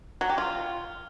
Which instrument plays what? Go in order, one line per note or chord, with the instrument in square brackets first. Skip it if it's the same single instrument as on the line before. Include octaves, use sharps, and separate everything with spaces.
[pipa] F#3
G4
F4